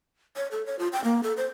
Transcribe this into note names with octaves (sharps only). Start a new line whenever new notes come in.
C#5
A4
C#5
F4
G5
A#3
A4
C5